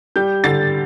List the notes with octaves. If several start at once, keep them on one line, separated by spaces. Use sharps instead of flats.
G3 G6
D3 A6